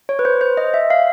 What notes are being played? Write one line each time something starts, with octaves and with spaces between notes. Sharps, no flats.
C#5
B4
C5
C5
D#5
E5
F5